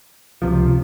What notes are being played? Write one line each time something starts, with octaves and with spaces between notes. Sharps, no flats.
C#2 C3 F3